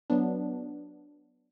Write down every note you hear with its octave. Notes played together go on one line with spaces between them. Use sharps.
F#3 B3 D4